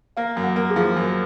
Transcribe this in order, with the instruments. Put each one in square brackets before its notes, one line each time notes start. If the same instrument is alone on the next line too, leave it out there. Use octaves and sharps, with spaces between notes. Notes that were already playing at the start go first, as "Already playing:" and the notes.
[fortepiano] A#3 [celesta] F5
[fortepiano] F#2
[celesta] F#5
[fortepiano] A#3
[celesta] G#4
[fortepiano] F3
F#2